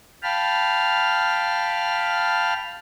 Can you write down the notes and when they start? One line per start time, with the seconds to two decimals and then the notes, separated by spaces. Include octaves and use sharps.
0.23 F5 G5 A5 B5 F6